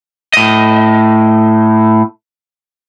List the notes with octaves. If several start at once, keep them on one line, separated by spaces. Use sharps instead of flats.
A2 D#5